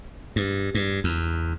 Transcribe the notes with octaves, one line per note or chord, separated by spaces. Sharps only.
G2
G2
E2